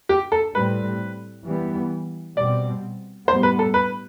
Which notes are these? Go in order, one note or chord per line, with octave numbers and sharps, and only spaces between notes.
G4
A4
A2 G3 C4 B4
E3 G3 B3
B2 G3 C4 D5
A2 G3 B3 C5
B4
A4
B4